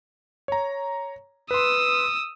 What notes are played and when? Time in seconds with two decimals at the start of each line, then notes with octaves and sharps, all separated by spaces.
0.48 C#5 A#5
1.51 B4 C6 D#6 E6